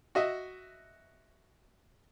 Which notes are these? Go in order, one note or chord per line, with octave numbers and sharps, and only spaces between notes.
F#4 D#5 E5